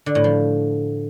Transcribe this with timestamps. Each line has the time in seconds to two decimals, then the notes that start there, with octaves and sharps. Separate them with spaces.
0.06 D3
0.15 A2
0.24 F3